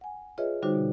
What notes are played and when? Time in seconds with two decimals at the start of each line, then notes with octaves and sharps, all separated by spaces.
0.01 F#5 G#5
0.38 F4 G#4 B4 C#5 D#5 E5
0.62 D3 G3 D#4 F#4 C5 D6
0.75 B2